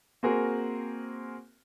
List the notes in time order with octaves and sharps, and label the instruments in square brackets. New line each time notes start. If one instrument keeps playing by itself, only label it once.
[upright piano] A#3 C4 F#4 G#4 A#4